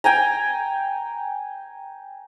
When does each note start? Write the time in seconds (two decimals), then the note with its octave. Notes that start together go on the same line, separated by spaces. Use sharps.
0.04 G5 G#5 A#5